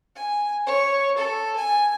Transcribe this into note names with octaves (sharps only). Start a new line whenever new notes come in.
G#5
C#5
A4
G#5